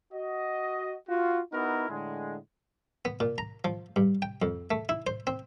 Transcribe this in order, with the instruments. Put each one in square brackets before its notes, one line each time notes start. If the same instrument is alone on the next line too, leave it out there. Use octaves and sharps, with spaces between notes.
[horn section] F#4 D#5
F4 F#4
B3 D#4 E4 F#4 A#4
A2 D3 G#3
[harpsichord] B3
A#2
A#5
F3
G2
G5
F2
A3
E4
C5
C4